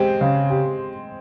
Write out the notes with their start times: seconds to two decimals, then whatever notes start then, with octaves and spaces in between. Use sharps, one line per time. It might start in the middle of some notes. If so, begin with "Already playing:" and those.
Already playing: G#3 C4 G4
0.21 C#3
0.50 G4